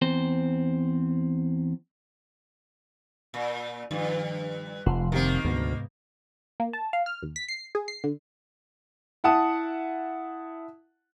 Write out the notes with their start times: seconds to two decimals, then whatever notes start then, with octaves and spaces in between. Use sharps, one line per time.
0.02 E2 C4 C5
3.34 A#2
3.91 G2 D#3 F3
4.86 F1 F3 F#5 C6
5.12 D#3 A#3 C4 G4 A#4
5.45 D2 G#2 C3 B3
6.60 A#3
6.73 A5
6.93 F5
7.06 F6
7.23 D#2
7.36 B6
7.48 C7
7.75 G#4
7.88 C7
8.04 D3
9.24 E4 F#5 A5 D#6